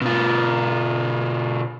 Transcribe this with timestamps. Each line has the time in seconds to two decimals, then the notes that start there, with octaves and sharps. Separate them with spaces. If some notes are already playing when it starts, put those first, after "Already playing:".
0.01 B2 F4